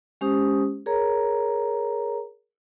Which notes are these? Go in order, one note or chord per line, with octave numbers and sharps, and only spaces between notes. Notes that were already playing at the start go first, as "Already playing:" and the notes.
G#3 C#4 G4 C5 D#6
G#4 A#4 C#5 A#5